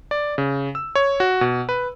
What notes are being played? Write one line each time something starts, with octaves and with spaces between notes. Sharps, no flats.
D5
C#3
E6
C#5
F#4
B2
B4